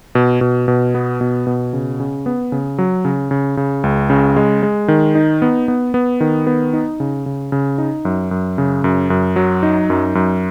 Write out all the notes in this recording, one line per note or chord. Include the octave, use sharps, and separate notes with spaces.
B2
B2
B2
B3
B2
B2
C#3
C#3
B3
C#3
F#3
C#3
C#3
C#3
C#2
C#3
G#3
G#3
D#3
D#4
B3
B3
B3
D#3
B3
D#4
C#3
C#3
C#3
D#4
F#2
F#2
C#3
F#2
F#2
F#3
D#4
F#2
F#2